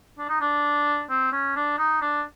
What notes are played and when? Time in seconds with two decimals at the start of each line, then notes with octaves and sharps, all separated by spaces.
0.18 D4
0.29 D#4
0.41 D4
1.10 C4
1.33 C#4
1.56 D4
1.78 D#4
2.01 D4